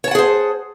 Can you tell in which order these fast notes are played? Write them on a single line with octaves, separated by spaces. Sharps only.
C#5 A5 F#5 G#4 C5